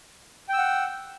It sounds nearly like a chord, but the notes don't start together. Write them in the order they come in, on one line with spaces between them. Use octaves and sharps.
G5 E6 F#5